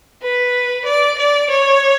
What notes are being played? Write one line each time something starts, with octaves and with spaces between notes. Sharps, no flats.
B4
D5
D5
C#5